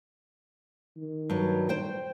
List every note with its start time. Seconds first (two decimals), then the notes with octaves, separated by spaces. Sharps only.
0.97 D#3
1.30 G2 F#3
1.69 C5 G5